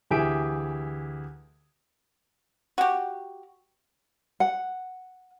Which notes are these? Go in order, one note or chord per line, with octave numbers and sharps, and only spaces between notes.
D2 E3 G4 G#4 E5 D7
F#4 G4
F#5